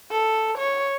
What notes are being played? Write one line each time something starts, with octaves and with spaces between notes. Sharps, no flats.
A4
C#5